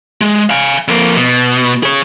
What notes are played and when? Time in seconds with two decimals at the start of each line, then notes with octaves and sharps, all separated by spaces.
0.21 G#3
0.50 F5 G#5
0.88 F2 A#3
1.17 B2
1.83 G#4 C#5